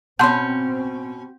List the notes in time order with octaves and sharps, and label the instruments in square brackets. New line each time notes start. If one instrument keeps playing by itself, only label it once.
[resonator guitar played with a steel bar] B2 C#4 [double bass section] C4 [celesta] F#5 G6 [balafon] A5 C6